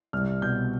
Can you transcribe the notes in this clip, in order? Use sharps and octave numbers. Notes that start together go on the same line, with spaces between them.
C2 F6
B2 G6